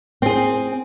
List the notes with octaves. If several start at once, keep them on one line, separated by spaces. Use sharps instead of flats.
C4 G#4